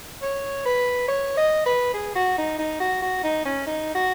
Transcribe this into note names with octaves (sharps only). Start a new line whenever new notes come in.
C#5
B4
C#5
D#5
B4
G#4
F#4
D#4
D#4
F#4
F#4
D#4
C#4
D#4
F#4